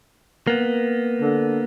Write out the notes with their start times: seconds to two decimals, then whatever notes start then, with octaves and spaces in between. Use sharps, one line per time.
0.47 A#3 B3
1.21 D3